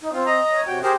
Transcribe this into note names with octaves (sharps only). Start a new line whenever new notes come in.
D#4
C4 F4
D#5 A#5
C#5
C3 F#4 G5
G4 G#4 A#4 C5